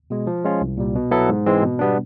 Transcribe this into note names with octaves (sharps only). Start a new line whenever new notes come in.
B2 G#3
F3
G#3 C#4 F4
C2
A#2 G3
B2
F#3 B3 E4 A4
G#2
E3 G#3 C4
B2
G3 B3 D4